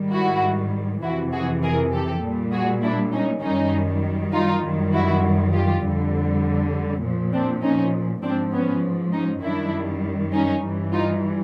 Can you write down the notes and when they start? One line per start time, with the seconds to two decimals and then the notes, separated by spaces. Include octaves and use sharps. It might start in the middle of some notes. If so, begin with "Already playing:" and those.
Already playing: G#2 D#3 G3
0.13 E4 F#4
1.02 F2 C3 E3 E4 F#4
1.33 F#4 G#4
1.63 G#4 A#4
1.93 G4 A4
2.23 A#2 G3
2.53 F#4 G#4
2.83 D4 E4
3.13 C#4 D#4
3.43 F#2 D#3 G3 C#4 D#4
4.33 D#4 F4
4.62 F#2 D#3 G3
4.93 E4 F#4
5.53 F4 G4
5.83 F2 D3 G3
7.03 A#2 F3
7.33 C4 D4
7.63 C#4 D#4
8.23 G#2 F3 C4 D4
8.53 B3 C#4
9.13 C#4 D#4
9.43 F#2 D#3 G3 D4 E4
10.33 C#4 D#4
10.63 G2 E3 G3
10.93 D#4 F4